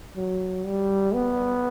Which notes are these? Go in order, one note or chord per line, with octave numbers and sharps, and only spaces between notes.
F#3
G3
B3